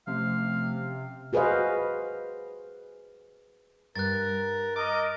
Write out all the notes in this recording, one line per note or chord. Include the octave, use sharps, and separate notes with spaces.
C3 F3 A3 C#4 F5
F#4 G#4 B4 C5 D#5 F5
G2 A#4 F#6 A6
A#4 D#5 D6